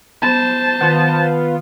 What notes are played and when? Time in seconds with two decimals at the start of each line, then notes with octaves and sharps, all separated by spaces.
0.22 B3 C5 A5
0.81 D#3 B3 F4